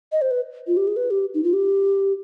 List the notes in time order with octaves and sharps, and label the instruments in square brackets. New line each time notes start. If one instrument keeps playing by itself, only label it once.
[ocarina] D#5
C5
B4
F4
G4
G#4
B4
G4
D#4
F4
G4